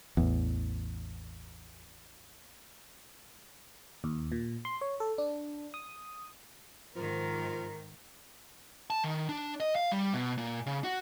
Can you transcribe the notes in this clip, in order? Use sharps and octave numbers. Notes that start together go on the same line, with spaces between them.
A1 E2
D#2
A#2
C6
C#5
A4
D4
D#6
G#2 D#3 F3 A#4
A5
D#3
D4
D#5
F5
G3
B2
A#2
C#3
F#4